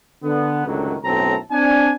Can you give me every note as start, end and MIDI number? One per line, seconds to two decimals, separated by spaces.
0.23 0.65 50
0.23 0.65 59
0.66 0.94 37
0.66 0.94 42
0.66 0.94 45
0.66 0.94 50
0.66 0.94 51
0.66 0.94 54
1.05 1.36 35
1.05 1.36 42
1.05 1.36 45
1.05 1.36 60
1.05 1.36 69
1.05 1.36 82
1.52 1.92 60
1.52 1.92 62
1.52 1.92 80